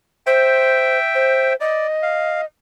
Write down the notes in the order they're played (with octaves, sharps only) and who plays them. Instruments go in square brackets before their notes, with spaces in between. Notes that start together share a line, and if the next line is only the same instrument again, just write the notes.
[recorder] C5 [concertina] E5 G5
[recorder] C5
[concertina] D5 [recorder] D#5
[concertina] F5